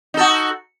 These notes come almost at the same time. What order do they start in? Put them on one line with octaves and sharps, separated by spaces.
D#4 A4 F#4